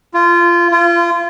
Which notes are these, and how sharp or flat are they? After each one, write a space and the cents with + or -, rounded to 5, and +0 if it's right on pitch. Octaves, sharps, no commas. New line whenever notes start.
F4 -20
F4 -30